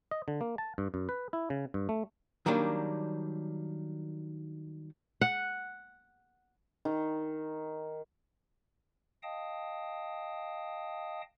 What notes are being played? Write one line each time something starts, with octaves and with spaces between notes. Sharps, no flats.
D#5
D3
A#3
A5
G2
F#2
B4
E4
C#3
G2
A3
D#3 F#3 G3 A#3 D4
F#5
D#3
D#5 F5 G5 A5 D#6